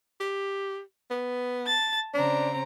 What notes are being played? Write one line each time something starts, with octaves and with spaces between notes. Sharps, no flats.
G4
B3
A5 A6
C#3 C4 D4 A#5